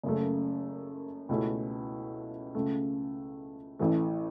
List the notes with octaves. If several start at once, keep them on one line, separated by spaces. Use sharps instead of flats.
F#1 F#2 C#3 A3
C#2 B2 A3 C#4 E4
C#2 C#3 A3
A1 A2 E3 A3